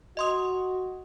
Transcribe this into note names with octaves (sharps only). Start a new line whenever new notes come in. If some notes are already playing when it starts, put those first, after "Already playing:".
F#4 D#5 C6 D#6